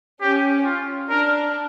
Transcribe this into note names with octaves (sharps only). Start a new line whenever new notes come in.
C#4 G4
F4
D4 A#4